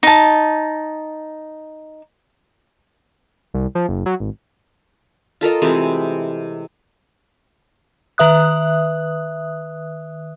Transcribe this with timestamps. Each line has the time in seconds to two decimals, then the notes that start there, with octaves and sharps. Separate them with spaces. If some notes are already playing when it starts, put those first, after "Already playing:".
0.03 D#4 A5
3.54 C2
3.75 F3
3.89 F#1
4.06 F#3
4.20 G#1
5.41 F4 A4 A#4 D#5
5.62 C3 E3 G#3 A3
8.18 D#3 B4 E5 D#6 F#6